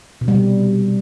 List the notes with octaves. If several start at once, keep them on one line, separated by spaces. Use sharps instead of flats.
B2
G3
C3